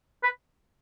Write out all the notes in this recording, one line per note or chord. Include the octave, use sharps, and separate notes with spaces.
B4